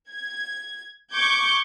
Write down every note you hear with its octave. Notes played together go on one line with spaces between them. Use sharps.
G#6
C#6 D6 G6 G#6